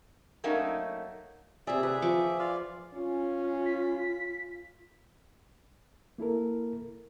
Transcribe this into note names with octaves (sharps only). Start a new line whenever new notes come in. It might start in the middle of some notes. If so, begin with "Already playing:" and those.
F#3 A3 A#3 C#4 D#4
C3 G#4 D5 E5
G#4 B4 E5
F3 C#6 D6
F4 D5 F5
C#4 F4
B6
A#3 E4 A4 A#4